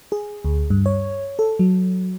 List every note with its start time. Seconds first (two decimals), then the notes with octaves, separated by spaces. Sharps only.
0.12 G#4
0.45 D2
0.70 G2
0.86 C#5
1.39 A4
1.59 F#3